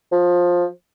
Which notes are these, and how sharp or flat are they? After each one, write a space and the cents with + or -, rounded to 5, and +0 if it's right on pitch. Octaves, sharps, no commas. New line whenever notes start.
F3 +15